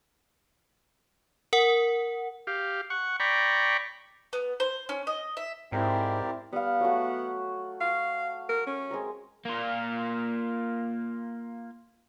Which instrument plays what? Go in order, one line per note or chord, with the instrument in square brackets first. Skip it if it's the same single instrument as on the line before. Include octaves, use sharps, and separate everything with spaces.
[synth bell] A#4 F#5
[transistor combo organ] G4 F5
F#5 C#6
D5 G5 A#5 B5 C#6
[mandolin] B3
C5
C#4
D#5
E5
[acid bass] G#2 [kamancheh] C4 E4 [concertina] G4 A#4 D5
[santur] G3 F5 [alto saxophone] B3
[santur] F#3 A3 F#4
[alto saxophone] F5
A#4
C#4
[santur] G#3 C4 A#4
[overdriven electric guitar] A#3 F4